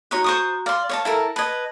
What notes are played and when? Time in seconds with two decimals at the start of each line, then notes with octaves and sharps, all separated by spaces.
0.11 D#4 F#4 C#5 D#5 A#5 F#6
0.24 C5 C#6 D#6
0.66 D5 F5 C6 F6
0.89 C#5 D5 A5
1.05 E4 A4 A#4
1.36 B4 D#5 A5 G#6